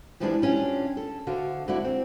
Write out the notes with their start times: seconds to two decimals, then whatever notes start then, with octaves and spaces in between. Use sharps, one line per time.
0.20 D2 E3 F3 G3 G#3 D4
0.42 G3 C#4 D4 F4
0.97 A4
1.27 D2 D3 F#4 F5
1.68 F2 D3 E4 F#4 D5
1.84 C4